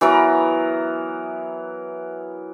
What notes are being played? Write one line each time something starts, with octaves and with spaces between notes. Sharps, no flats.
E3 F#3 B3 A#4